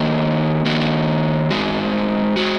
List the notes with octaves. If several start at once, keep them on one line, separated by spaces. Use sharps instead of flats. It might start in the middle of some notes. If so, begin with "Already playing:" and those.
Already playing: D#3 A#3 F#4
D#3 A#3 F#4
G#2 G#3 F#4
G#3 F#4